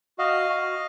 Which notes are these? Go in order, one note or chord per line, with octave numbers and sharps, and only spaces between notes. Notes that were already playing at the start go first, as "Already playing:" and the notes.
F#4 D#5 F5
F#4